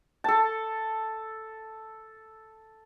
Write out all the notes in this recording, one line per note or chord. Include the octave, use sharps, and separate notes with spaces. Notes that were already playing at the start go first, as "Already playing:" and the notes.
A4 A5